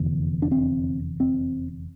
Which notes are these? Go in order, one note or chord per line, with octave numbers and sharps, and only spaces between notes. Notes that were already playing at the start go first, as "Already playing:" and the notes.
Already playing: F1 E2 D3
D4
C4
C4